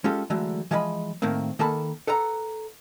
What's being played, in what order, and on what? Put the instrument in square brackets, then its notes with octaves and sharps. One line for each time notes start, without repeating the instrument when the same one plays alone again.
[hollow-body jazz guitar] G#3 C#4 F4 G4 A4
D3 E3 F#3 G#3 A3
E3 F3 G#3 D#5 F#5 B5
A2 D#3 A3 A#3 C4
D#3 A#3 A4 A5 B5
A4 B4 F#5 A#5